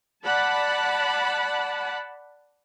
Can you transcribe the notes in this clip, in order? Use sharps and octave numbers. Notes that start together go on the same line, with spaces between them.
D5 F#5 A5 B5